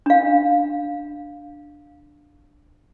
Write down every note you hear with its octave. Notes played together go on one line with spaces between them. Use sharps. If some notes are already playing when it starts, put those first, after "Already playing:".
D4 F5